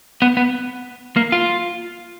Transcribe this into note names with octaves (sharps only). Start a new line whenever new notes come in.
B3
B3
A#3
F4